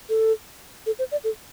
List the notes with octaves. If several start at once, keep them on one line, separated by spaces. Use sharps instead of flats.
A4
A4
C5
D5
A4